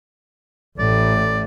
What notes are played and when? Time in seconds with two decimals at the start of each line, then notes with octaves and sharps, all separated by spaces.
0.79 A1 A2 D5